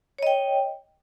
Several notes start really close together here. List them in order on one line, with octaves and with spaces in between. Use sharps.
C#5 D#5 G5